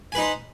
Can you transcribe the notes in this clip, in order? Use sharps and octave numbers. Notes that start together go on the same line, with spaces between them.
D#4 B4 C5 G#5